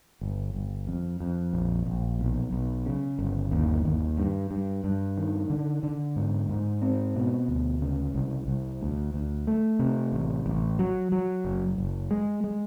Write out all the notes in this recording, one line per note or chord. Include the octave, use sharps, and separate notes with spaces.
G1
G1
F2
F2
A#1
A#1
B1
B1
C#3
G1
D#2
D#2
G2
G2
G2
D#3
D3
D3
G#2
G#2
C4
B2
D2
C#3
C2
C2
D2
D2
A3
C3
A1
A1
F#3
F#3
F#1
F#1
G#3
G#3